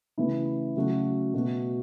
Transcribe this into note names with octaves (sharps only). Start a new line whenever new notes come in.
C#3 E3 A3 E4
C#3 F#3 A3 F#4
B2 A3 F#4